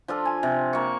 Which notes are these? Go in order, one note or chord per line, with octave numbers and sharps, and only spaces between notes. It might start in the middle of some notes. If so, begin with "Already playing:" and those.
F3 D4 F4 A4
G#5
C3
A#3 C#6